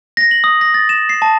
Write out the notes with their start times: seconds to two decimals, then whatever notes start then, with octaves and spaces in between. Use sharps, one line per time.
0.17 A#6
0.31 F#7
0.44 D#6
0.61 A#6
0.74 A6
0.89 E7
1.09 C7
1.22 A5